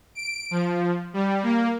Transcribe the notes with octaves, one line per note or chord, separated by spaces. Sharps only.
D7
F3
G3
A#3